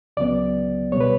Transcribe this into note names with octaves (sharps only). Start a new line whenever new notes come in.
C#2 C#3 F#3 B3 D5
B2 G3 B3 C#5
B4